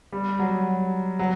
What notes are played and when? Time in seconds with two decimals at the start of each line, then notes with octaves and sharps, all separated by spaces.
0.12 G3
0.39 F#3
1.19 F#3